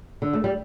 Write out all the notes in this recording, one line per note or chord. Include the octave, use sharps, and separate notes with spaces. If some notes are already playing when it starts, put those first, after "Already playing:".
D3
A3
G3